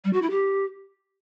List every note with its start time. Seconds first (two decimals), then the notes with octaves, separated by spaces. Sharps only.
0.04 G3
0.13 F#4
0.22 E4
0.30 G4